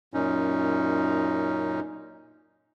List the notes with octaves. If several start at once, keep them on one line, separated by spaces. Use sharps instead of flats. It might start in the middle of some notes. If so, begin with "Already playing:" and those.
F#2 A#2 C#4 D#4